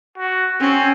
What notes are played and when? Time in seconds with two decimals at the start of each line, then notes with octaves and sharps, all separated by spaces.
0.18 F#4
0.61 C4 C#4